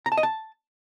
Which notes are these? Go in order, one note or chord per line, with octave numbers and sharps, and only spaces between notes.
A#5
A5
D#5
A5